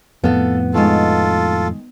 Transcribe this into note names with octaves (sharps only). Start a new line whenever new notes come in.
F2 A2 B3 A4 F5
D#3 G#3 F4 A4